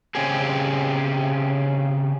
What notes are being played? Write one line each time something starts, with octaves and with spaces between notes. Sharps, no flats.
C#3 C4 G4 G#4